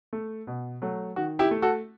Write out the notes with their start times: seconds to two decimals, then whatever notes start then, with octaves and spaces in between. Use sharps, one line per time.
0.13 A3
0.47 B2
0.82 F#3 A3
1.16 D#3 F#4
1.39 E4 G4
1.51 A3
1.62 F#4 A4